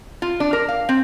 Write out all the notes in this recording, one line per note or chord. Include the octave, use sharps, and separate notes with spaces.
F4
D4
A#4
F5
C4